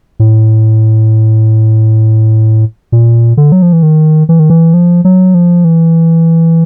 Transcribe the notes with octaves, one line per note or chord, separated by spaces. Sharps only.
A2
A#2
D3
F#3
F3
E3
D#3
E3
D#3
E3
F3
F#3
F3
E3